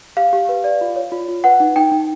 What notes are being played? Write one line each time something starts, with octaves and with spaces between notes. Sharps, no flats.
G4 F5
G4
B4
D5
F4
C#5
F4
F4
B4 F#5
D#4
D#4 G5
D#4